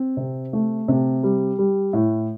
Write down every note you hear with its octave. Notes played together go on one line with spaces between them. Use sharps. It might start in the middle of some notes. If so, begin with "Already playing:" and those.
Already playing: C4
C3
A3
C3
G3
G3
A2